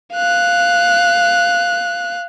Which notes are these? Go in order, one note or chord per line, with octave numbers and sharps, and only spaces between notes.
F5 F#6